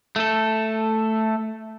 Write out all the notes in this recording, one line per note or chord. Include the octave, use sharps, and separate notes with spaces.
A3 A4